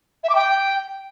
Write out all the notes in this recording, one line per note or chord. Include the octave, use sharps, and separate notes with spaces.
E5
D6
G5